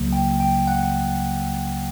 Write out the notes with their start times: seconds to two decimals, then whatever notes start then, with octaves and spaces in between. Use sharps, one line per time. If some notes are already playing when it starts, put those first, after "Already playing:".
Already playing: C#2 C#3 F#3 A#3
0.13 G5
0.40 G5
0.67 F#5